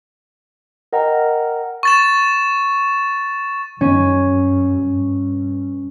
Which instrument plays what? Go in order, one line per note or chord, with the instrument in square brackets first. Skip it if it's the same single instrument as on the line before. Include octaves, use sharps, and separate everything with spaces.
[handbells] A#4 D#5 F#5 G5 A#5
[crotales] C#6 A6 E7
[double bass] F#2 [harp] C#4
[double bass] G2